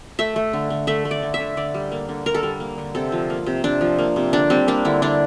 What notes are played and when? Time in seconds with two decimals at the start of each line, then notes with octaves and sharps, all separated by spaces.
0.19 A3 E5
0.36 A3
0.53 D3
0.70 D3
0.87 A3 E5
1.05 A3
1.11 D5
1.22 D3
1.34 E5
1.40 D3
1.57 D3 D5
1.74 G3
1.92 A#3
2.09 D3
2.26 D3 A#4
2.34 A4
2.43 G3 A#4
2.60 A#3
2.78 D3
2.95 C3 A4
3.12 F3
3.30 A#3
3.46 C3
3.64 C3 D4
3.81 F3
3.99 A#3
4.16 C3
4.33 D3 D4
4.50 G3 C4
4.68 A#3 D4
4.85 D3 E4
5.02 D3 D4